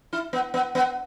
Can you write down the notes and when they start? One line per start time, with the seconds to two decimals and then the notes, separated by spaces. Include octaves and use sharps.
0.13 E4
0.33 B3
0.54 B3
0.75 B3